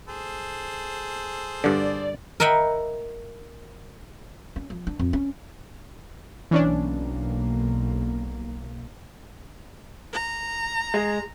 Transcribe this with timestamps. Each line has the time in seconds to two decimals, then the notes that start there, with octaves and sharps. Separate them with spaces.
0.08 G#4 A4 C5
1.64 G2 D3 D5
2.40 A#4 D#5 E5 F#5 G5 B5
4.56 C#4
4.70 F3
4.87 D4
4.99 F2
5.13 C#4
6.51 B1 E3 A#3 C#4 D4
10.13 A#5
10.94 G#3